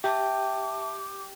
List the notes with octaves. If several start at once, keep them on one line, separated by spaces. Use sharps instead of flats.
G4 E5 G5 A5 D6